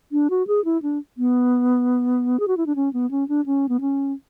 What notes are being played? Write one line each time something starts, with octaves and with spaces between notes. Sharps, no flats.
D4
F#4
G#4
E4
D4
B3
G#4
F#4
E4
D4
C#4
B3
C#4
D4
C#4
B3
C#4